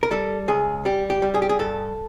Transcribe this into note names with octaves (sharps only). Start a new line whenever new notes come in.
A#4
G3 A4
C#2 G#4
G3 G4
G4
G3
G#4
G4
G#4
G2 A4